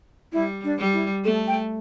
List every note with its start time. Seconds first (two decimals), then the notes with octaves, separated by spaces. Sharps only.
0.33 G3 E4
0.64 D4
0.79 G3
0.93 E4
1.24 A3 A4
1.47 G5